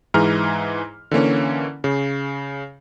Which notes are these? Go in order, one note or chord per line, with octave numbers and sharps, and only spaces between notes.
G#2 E3 G#4 A#5 F6
D3 E3 A#3 C#4
C#3